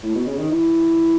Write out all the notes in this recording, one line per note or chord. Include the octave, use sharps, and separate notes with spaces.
A2
B2
C#3
D#3
E3